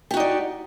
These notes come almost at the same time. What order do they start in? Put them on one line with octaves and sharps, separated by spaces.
G4 F#4 D#4 D5